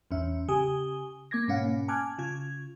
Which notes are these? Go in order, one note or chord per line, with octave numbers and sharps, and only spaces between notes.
A1 E2 C#4 E5
C#3 G4 G#5 D#6
A#3 D6 G#6 A#6
G#2 B2 A#3 C#4 F5 F#5
G#5 A5 D6 F6 F#6 G#6
C#3 F4 G#6